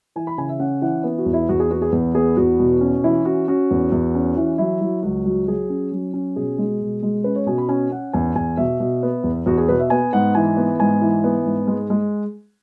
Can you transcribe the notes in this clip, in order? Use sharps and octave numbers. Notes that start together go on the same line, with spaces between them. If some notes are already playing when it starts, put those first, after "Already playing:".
E3 G#5
B5
C#3 G#5
E5
C#4 F#5
E3 F#5
B3
F#4
E2
E4
E2 F#4
G#4
B3 F#4
G#4
E2
B3 G#4
E2 F#4
B2
C#4
E3 E4
C#4 F#4
C#4 F#4
E2
E2
C#4
E3
F#3 E4
F#3
C#2 F#4
F#3
F#3 G#4
C#4
F#3
C#4
B2 G#4
G#3
B2
G#3
C#4 B4
C#5
B2 G#5
B5
C#4 G#5
C#4 F#5
E2 G#5
E2 G#5
B2 E5
B2
B3
E2
E2 F#4
G#4
B2 B4
E5
B3 G#5
G#2 F#5
E3 G#5
B3
G#2 G#5
E3
B3
G#2
G#3
G#3